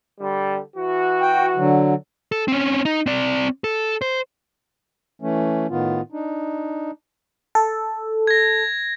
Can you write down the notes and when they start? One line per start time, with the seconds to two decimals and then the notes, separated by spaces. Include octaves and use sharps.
0.20 D3 G3
0.76 E3 F#4
1.21 G5
1.56 D3 F#3
2.32 A4
2.48 C4 C#4
2.85 D#4
3.06 C4 D5
3.64 A4
4.02 C5
5.22 E3 A3 C#4
5.70 A2 D#3 B3 F4
6.12 D4 D#4
7.55 A4
8.27 G#6 A#6